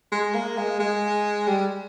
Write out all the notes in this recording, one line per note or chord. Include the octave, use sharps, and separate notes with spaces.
G#3
A#3
G#3
G#3
G3